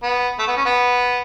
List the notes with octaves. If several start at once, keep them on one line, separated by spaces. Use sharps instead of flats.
B3
A3
B3
C#4
B3